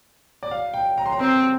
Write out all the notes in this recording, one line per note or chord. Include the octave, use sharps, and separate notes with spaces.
D5
F5
G5
A#5
C6
A#5
C4 C6